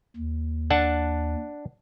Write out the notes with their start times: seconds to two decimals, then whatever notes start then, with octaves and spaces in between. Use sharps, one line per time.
0.17 D#2
0.70 D4 F#5 A5